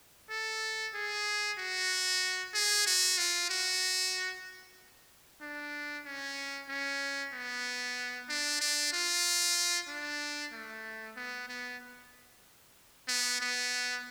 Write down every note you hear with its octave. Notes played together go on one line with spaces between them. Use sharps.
A4
G#4
F#4
G#4
F#4
F4
F#4
D4
C#4
C#4
B3
D4
D4
F4
D4
A3
B3
B3
B3
B3